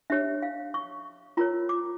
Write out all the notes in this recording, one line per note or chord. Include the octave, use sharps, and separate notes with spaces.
D4 G4 C#5 E5
F5
C#6
F4 A#4 C#5 A#5
D6